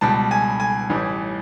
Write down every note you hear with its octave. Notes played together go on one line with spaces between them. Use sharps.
C#2 B2 G3 A5
G#5
G#5
A1 A2 E3 G3